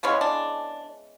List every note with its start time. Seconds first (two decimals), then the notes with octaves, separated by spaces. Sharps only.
0.03 C#3 E3 G#3 B3 C#4
0.21 D4